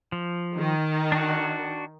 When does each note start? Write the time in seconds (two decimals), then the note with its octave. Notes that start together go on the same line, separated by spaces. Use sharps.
0.12 F3
0.57 D#3
1.12 D4 F#4